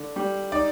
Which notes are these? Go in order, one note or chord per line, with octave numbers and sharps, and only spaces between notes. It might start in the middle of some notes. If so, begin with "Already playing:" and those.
Already playing: D3
G3
D#4 D5